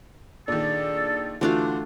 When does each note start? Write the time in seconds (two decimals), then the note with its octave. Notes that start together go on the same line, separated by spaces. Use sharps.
0.48 A#2 D#3 D4 G#4 A4
1.41 D3 E3 A3 D4 F4 F#4